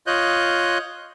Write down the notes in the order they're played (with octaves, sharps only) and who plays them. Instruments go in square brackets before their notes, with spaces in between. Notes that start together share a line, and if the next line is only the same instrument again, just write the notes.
[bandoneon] F4 C#5 D#5 F#6 G6